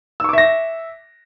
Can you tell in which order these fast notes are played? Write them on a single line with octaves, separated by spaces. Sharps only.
E6 C#6 D6 E5 A#6